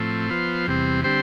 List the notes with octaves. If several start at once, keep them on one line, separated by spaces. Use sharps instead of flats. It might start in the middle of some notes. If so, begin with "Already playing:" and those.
Already playing: A2 F3 A3 C4
F3 B3 F4 C5
E2 C3 G3 C4
D3 G3 C4 G4 C5